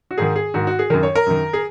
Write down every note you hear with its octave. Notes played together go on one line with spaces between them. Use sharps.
F#4
G#2 D#3 G#4
G#4
G#2 D#3 F#4
F#4
G#4
F#2 D#3 A#4
C#5
A#4
F#2 D#3
G#4